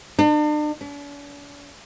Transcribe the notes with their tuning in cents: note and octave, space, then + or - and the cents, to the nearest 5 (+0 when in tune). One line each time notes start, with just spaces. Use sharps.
D4 +40
D4 -45